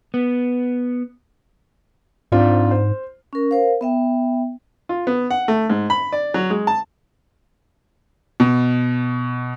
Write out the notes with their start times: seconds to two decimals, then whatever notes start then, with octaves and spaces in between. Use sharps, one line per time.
0.14 B3
2.32 G#2 C4 D4 F4
2.71 C5
3.33 C#4 A#4
3.51 A#4 C5 F5
3.81 B3 E5 G5
4.89 F4
5.07 B3
5.31 F#5
5.48 A3
5.70 G#2
5.90 B5
6.13 D5
6.34 F#3
6.50 G#3
6.67 A5
8.40 B2